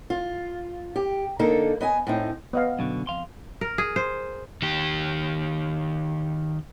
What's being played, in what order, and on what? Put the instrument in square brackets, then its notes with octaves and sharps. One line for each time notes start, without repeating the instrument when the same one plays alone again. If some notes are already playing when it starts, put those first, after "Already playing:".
[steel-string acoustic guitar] F4
G4
D3 A#3 D#4 A4
B3 D#5 G#5
A2 C4 D#4
[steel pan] B3 D#5 F5
[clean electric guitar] F#2 B2 D3
F2 F5 C6
[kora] A#4
G#4
C5
[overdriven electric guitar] D#3 G4